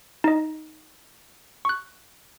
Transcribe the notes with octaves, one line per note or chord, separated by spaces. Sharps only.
D#4 D#5
C#6 F#6